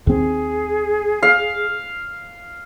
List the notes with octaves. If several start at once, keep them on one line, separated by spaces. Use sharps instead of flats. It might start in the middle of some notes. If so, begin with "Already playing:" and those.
D#2 C4 G#4
F5